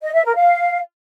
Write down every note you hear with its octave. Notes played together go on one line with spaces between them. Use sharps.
D#5
E5
A#4
F5